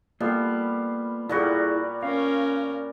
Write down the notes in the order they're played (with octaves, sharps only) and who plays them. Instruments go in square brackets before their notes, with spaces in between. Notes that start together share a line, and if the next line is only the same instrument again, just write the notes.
[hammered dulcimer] G3 B3 [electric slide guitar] A#3 F4 A4
[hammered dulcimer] A#2 G3 F#4 [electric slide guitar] E4 G#4 A4
[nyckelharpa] C#4 A#4 [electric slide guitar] F5